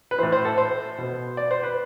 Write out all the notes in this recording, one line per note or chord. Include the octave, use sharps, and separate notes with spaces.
B4
A2 E3 C5
C5
A4
C5
B2
D5
C5
B4